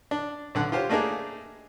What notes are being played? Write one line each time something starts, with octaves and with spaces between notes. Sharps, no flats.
D4
B1 D3 F#5
F4 G4 C5 C#5
A3 A#3 D4 D#4 G#4